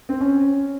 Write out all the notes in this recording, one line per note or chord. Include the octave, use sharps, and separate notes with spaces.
C4
C#4